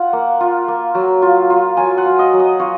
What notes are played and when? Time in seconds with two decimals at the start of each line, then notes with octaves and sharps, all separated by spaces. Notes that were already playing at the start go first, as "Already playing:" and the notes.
Already playing: F4 F#5
0.13 A#3
0.40 F4
0.68 A#3
0.95 F#3
1.22 F4
1.50 F4
1.77 F#3 G#5
1.98 F#5
2.05 F4
2.19 D#5
2.33 F#3
2.40 D#5
2.60 F4 C#5